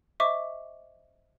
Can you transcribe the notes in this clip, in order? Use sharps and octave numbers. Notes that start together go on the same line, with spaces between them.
C5 D#5 E5 C#6 D6